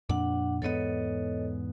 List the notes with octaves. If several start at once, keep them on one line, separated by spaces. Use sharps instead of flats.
F2 A#2 D4 F#5
E2 G#2 B3 A4 C#5 D#5